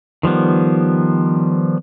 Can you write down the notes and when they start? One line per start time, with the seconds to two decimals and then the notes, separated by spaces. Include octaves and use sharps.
0.23 D#3 F3 G3 B3